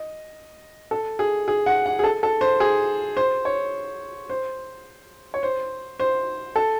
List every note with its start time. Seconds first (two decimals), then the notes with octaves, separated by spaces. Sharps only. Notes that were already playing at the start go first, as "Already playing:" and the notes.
Already playing: D#5
0.91 A4
1.19 G#4
1.48 G#4
1.66 F#5
1.86 F#5
1.99 G#4
2.04 A4
2.23 A4
2.41 C5
2.60 G#4
3.17 C5
3.45 C#5
4.29 C5
5.34 C#5
5.43 C5
6.00 C5
6.56 A4